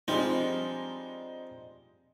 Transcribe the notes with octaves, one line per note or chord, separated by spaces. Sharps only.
F3 G3 G#3 C4 D4 D#4